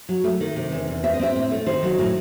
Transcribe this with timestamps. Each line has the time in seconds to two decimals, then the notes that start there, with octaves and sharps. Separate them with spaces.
0.09 F#3
0.24 A3
0.40 D#3
0.56 C3
0.72 E2
0.88 E2
1.03 C4 E5
1.13 D#5
1.20 C4 E5
1.36 A2
1.51 A3
1.66 D#3 C5
1.83 F#3
1.98 A2